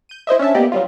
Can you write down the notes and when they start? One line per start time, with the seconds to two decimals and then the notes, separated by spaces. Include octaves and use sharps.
0.09 G6 D#7
0.27 E4 C5 D#5 E5
0.39 C#4 D4 E5 A5
0.55 A#3 B3 G4 D5 D#5
0.72 F#3 G3 F4